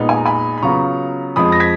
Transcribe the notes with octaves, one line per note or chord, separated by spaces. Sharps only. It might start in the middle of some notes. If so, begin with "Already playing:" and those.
Already playing: A#2 G#3 B3 D#4
G#5
A#5
G#5 B5
B5
C#3 F#3 B3 F4 A#5 C#6
F2 F3 G#3 B5 D#6
A#6
G#6 B6